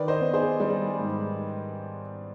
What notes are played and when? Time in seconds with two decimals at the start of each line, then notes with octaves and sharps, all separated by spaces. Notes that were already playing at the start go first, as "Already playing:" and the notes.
Already playing: D#3 B4 D5
0.08 C5 D#5
0.21 B3
0.33 G#4 C5
0.60 G3 G#4
0.99 G#2